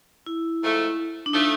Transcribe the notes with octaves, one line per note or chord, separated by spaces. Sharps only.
E4
G#2 F3 A3
D4
F3 A3 D#4